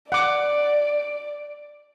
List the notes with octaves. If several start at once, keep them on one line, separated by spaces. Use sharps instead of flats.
D5 F#5 D6